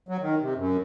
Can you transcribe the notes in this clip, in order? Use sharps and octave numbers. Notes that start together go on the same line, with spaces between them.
F#3
D#3
C3
F#2